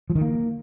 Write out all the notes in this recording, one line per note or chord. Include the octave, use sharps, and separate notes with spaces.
F3
D#3
A#3